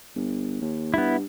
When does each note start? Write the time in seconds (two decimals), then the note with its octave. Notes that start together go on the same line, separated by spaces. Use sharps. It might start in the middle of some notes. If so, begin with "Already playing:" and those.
0.15 G1
0.61 D#2
0.94 G2 B3 E4